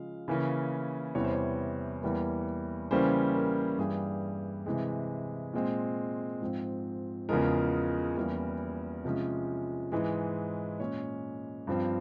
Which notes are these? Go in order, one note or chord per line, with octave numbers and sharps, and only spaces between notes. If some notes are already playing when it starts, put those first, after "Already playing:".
Already playing: C#3 F3 G#3 F5
C#3 E3 A#3 C#4
E2 C3 E3 G3 C#5
C5
C#5
E2 E3 G3 A#3
C#3 E3 G3 A#3 C#4 C5
A#4
G2 E3 G3 G#4
C3 E3 G#3
A#2 G#3 C4
G#2 F3 C4
E2 C#3 F3 G#3 A#4
E2 E3 G3 A#3 C#4
C3 F3 G#3 C#4
G#2 E3 G#3
A#2 G#3 C#4 C#5
G2 F3 C4